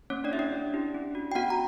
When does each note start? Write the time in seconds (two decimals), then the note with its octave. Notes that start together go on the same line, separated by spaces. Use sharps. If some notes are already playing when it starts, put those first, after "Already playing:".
0.10 A#3 C#4 C#5
0.24 D4 D5
0.31 E4 G4 E5
0.39 D4 D5
0.52 C#4
0.74 E4 G4
0.95 C#4
1.15 F#4
1.32 G5
1.35 B3 F#4 F#5
1.50 A#5